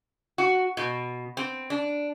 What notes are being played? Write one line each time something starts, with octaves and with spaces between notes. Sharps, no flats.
F#4
B2
C4
D4